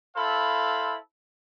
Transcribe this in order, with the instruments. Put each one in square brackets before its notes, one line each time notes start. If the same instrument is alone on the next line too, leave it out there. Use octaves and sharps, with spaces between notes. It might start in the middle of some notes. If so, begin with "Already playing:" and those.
[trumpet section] E4 A4 C5 F5 B5